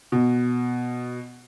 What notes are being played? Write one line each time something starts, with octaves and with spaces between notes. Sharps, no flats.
B2